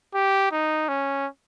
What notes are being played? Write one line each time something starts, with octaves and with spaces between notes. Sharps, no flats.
G4
D#4
C#4